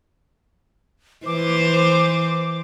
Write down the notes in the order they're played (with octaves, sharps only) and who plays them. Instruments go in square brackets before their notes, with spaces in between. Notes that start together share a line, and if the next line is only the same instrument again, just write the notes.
[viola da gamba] E3 C5 [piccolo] D6